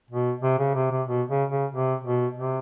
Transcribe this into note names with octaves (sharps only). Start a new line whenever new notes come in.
B2
C3
C#3
C3
C3
B2
C#3
C#3
C3
B2
C3